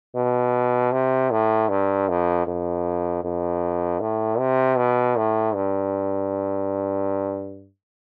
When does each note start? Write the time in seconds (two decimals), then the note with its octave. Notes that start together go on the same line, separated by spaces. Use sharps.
0.16 B2
0.92 C3
1.31 A2
1.69 G2
2.09 F2
2.47 F2
3.24 F2
4.00 A2
4.39 C3
4.77 B2
5.16 A2
5.54 G2